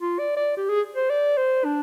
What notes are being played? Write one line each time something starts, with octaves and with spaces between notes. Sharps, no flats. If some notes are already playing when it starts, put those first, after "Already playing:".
F4
D5
D5
G4
G#4
C5
D5
C5
D4